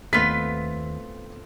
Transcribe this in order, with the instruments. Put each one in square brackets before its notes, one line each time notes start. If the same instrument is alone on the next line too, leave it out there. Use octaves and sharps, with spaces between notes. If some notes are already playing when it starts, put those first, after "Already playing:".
[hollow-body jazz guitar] D#2 [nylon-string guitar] A3 B3 C4 [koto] F4 B4 [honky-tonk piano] B6